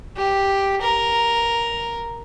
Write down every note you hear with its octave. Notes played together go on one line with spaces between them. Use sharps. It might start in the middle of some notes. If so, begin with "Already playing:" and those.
G4
A#4